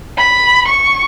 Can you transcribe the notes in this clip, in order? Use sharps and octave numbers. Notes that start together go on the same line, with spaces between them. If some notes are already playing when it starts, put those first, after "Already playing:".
B5
C#6